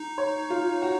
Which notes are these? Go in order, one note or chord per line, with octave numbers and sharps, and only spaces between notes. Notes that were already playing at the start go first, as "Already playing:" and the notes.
Already playing: D#4
C#5
F4
F#4